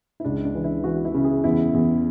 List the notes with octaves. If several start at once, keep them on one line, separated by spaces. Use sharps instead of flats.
E4
C#2 D4
D4
E3
E4
E3 F#4
E4
C#3
G#4
E2 E4
E2